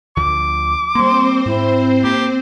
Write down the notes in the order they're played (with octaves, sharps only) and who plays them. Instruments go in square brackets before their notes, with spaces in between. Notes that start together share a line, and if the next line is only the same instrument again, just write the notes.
[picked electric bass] D2 D3 F3 [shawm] D6
[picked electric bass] G3 A#3 [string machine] C4 C5 [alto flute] C6
[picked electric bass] G#2 [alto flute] E4
[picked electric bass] A#3 [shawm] G4